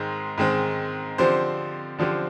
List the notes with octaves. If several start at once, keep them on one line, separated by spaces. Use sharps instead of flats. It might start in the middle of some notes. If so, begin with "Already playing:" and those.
Already playing: G#2 D#3 G#3 C4
G#2 D#3 G#3 C4
D3 F3 C4 G4 C5
D3 F3 C4 G4 C5